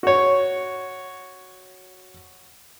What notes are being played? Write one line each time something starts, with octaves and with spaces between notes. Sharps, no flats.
F#4 C#5